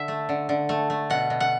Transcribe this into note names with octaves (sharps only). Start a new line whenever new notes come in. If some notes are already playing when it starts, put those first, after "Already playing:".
Already playing: D3 E5
A3
D3
D3
A3
A3
B2 F#5
B2
F#5